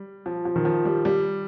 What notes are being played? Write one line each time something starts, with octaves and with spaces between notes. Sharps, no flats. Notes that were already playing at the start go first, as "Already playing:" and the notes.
Already playing: G3
F3
F3
D#3
F3
G3
G3